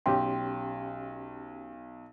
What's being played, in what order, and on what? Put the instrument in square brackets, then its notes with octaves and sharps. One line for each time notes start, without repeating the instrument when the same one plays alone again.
[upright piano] B1 [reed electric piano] C#4 G4 [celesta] G5 C6